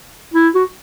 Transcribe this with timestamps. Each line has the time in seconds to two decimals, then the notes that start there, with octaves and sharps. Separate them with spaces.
0.34 E4
0.55 F#4